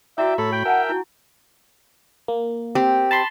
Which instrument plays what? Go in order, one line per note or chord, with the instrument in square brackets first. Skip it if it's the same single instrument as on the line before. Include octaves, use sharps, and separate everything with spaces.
[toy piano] E4 F#4 E6 [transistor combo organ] D5 G5 [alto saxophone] E5
[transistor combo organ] A2 C#5 B5 [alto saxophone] A4
[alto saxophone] G5
[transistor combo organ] A#4 E5 [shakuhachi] F#5 [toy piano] G#5 A5
[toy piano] E4 [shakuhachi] F#4
[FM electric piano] A#3
[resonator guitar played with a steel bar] C4 G4
[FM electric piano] A5 B5 C6